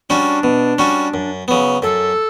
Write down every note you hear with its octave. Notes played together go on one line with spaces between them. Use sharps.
G3 C#4 D4 F#4
B2
G3 C#4 F#4
F#2
C#3 F#3 B3
F#2 A4